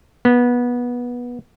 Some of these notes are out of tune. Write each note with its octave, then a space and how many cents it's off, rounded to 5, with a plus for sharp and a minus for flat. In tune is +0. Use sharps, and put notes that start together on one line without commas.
B3 -20